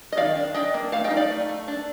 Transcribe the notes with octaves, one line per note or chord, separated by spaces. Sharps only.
D#5
D#3 D5 F5
D4
D4 D#5 G5
A#3
A3 F5 A5
D#5 G5
D#4
D5 F5
A3
A3
D4